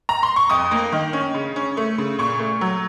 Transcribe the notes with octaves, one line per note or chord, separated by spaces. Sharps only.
A#5
C6
C#6
F2 D#6
A#3
D#3
C#4
C#3
C#4
A3
C#3
A#2 C#6
A3
F#3